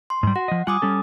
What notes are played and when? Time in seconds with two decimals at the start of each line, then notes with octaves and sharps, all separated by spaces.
0.10 C6
0.23 G#2 G3
0.36 F#4 F#5
0.48 F3 D#5
0.67 G3 F4 F#5 G#5 D6 D#6
0.82 G3 C#4 A4